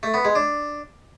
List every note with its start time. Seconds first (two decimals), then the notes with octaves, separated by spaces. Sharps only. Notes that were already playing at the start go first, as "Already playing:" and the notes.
0.03 A3
0.14 B3
0.25 G#3
0.35 D4